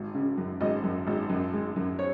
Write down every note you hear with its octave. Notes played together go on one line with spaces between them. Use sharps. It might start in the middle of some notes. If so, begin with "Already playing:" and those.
Already playing: G#1
C#3
F#2
G#1 D#5
F#2
G#1
F#2
G#3
F#2
C#5